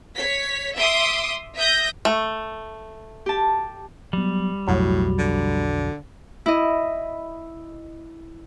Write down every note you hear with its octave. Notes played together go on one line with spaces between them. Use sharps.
C#5 B6
E5 C6 D6 D#6
E5 D#6 G6 A#6
A3
G4 A5
F#3 G3 B3
B1 F2 A2 F#3
D3
E4 D#5